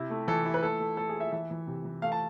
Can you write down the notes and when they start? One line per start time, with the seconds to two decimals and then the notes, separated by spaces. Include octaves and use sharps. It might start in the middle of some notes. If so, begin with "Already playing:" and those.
Already playing: C3 E4
0.10 A3
0.28 E3 A4
0.46 E4
0.54 B4
0.63 A3 A4
0.80 A3
0.97 A3 A4
1.09 G#4
1.16 E4 E5
1.32 E3 E5
1.51 E3
1.67 C3
1.85 E3
2.02 A3 F5
2.12 A5